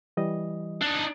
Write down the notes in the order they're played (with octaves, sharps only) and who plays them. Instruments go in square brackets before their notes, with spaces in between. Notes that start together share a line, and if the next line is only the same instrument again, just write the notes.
[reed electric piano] E3 G3 D#5
[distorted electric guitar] D4 D#4